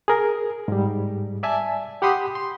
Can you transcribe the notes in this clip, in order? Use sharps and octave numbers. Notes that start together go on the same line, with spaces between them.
G#4 A#4
G#2 G3
D5 E5 G#5 A5
G4 F#5 B5 C6 D#6
C6